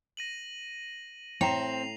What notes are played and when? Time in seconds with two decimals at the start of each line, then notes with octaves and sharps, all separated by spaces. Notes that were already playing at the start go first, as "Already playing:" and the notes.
0.17 A#6 D#7 F#7
1.41 A2 C4 G5 A#5 C7 F7